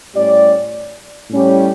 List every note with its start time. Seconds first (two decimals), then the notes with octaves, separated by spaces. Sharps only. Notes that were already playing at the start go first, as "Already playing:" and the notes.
0.14 A2 G3 C#4 G4 D5
1.30 A2 G3 C#4 G4